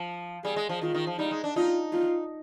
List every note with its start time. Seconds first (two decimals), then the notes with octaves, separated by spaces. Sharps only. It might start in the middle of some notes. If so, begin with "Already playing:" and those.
Already playing: F3
0.44 G3 G#4
0.56 G#3
0.69 F3
0.81 D#3 F4
0.94 D#3
1.07 F3
1.19 G3 D#4
1.31 G#3
1.44 D4
1.56 D#4 F4
1.93 F4